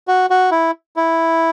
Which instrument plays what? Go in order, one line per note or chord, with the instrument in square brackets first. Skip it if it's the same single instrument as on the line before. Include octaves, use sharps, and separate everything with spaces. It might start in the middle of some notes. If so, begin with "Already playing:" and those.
[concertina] F#4
F#4
E4
E4